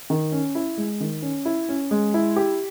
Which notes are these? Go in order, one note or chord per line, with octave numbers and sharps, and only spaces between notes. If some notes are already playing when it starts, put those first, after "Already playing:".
D#3
C#4
E4
G#3
D#3
C#4
E4
C#4
G#3
E4
G4